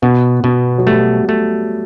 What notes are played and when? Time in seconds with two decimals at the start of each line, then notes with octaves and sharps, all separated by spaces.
0.02 B2 B3
0.44 B2 B3
0.78 F#3
0.87 G3 A3
1.29 A3